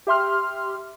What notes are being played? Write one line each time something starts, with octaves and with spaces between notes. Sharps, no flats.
G4 E5 C6 F6